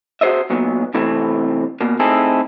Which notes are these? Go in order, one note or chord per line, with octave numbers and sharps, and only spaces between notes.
F#4 G#4 C5 D#5 E5
A#2 F#3 B3
C3 E3 A3 B3 C4
B2 A#3
A3 C4 D#4 E4 G#4 A4